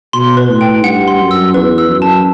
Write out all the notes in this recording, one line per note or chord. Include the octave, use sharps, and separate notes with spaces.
B2 C6
B4
A2
G5
G2 F#5
C6
F#2
E6
E2 B4
E6
F#2
A5